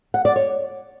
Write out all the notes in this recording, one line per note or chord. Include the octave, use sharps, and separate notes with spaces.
F#5
D5
C#5